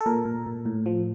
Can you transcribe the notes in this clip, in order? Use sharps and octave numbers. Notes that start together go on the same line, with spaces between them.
A4
A#2 A#4
A#2
A#2
A2
F3